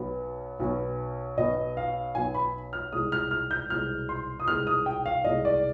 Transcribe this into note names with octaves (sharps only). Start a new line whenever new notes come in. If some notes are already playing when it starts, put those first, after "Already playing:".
Already playing: B1 B2 B3
B1 B2 B3
B1 B2 B3 D#5
F5
B1 B2 B3 G#5
B5
F6
C2 B2 G#3 D#6
F6
F6
G6
C2 B2 G#3 F6
C6
D#6
C2 B2 G#3 F6
D#6
G5
F5
C2 B2 G#3 D#5
D5